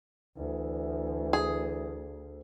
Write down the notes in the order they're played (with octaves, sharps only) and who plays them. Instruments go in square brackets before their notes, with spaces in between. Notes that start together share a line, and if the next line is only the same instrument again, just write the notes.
[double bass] D2 [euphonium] E3
[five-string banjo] G#4